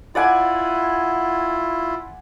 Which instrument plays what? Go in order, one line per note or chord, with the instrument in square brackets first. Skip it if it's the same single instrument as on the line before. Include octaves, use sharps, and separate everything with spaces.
[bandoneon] E4 F4 [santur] D5 F#5 G#5